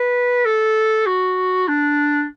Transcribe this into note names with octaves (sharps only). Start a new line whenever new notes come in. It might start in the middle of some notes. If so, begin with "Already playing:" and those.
Already playing: B4
A4
F#4
D4